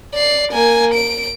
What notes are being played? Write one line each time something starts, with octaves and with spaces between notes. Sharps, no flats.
D5 C7
A#3 G#5
D7